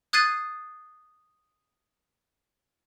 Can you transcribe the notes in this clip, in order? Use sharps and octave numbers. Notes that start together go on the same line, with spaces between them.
D#6 F#6 G#6 A6 C7 D#7